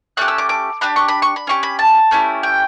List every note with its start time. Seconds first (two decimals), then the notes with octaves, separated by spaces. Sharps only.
0.17 A3 C#4 G4 F#6
0.28 E6
0.38 D6
0.49 D6
0.81 D4 G4 B5
0.96 C#6
1.08 B5
1.22 C#6
1.36 B5
1.47 C#4 G4 C#6
1.63 B5
1.79 A5
2.11 A3 C#4 E4 G4
2.43 G5